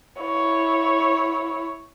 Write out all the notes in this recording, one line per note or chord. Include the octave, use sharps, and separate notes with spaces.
E4 C#5